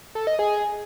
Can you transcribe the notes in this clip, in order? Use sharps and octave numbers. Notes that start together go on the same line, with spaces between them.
A4
D#5
G#4